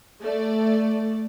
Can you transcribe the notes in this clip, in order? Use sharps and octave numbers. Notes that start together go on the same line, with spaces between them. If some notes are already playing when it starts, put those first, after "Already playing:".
A3 D5